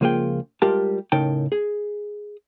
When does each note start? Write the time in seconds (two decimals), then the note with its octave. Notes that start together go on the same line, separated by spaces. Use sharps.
0.01 C#2 F3 A#3 F4 G#4 G5
0.62 G3 G#3 F4 G4 A#4 A5
1.12 A2 C#3 D#4 A#4 G5 A5
1.52 G#4